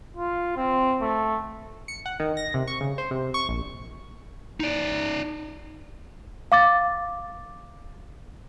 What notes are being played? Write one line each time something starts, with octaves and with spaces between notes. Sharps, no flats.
F4
C4
A3
C#7
F#5
D#3
A#6
C3
C#6
C#3
C5
C3
C#6
A#1
D#4 D5
F5 D6 A6